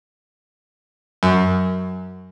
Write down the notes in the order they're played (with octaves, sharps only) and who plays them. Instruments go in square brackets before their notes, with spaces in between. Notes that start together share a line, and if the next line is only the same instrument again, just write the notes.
[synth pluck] F#2